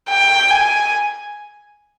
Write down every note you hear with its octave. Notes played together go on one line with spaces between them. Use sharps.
G5
G#5